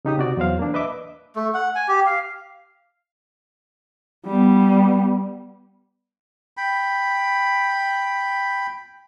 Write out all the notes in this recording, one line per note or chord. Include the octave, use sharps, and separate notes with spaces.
C#3 D#4 G4 D#6
C3 F#4 D5
E2 F#3 C5 F5
A#3 D4
B4 D#5 E5 D6
A3
F#5
G#5
G4
F5
G3 B3
G5 B5